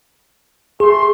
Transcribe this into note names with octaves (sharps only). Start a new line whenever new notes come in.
A3 G#4 C6